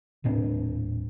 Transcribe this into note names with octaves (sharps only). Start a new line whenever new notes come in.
D#1 A2 C4 D4